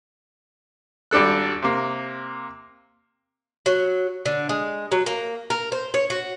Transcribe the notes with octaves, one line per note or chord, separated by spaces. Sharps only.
G#1 G3 D4 A4 F#6
C3 A#3
F#3
D3
G#3
F#3
A#3
A#4
C5
C#5
F#4